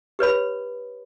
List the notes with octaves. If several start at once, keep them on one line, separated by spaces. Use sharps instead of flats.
G4 B4 C#5 B5